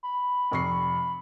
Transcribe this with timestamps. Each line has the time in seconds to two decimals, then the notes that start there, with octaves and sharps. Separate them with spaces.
0.03 B5
0.51 F1 C#6 C7